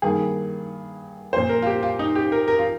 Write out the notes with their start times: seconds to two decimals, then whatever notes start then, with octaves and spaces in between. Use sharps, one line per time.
0.02 G2 D#3 A#3 G#4
1.33 A#2 F3 A#3 C5
1.49 A#4
1.62 F4
1.67 G4
1.83 F4
1.99 D#4
2.15 G4
2.32 A#4
2.48 A#4
2.59 F4